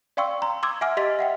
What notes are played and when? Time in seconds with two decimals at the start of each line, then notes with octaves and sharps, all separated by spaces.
0.17 D5 F5 G5 C6 C#6 E6
0.42 A#5 C6
0.63 C6 D6 E6 G#6
0.81 E5 F#5 G#5 D6 F6
0.97 G4 D#5 C6 A6 B6
1.19 E5 F#5 G5